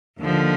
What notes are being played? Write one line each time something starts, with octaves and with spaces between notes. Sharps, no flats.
D#2 D3 F3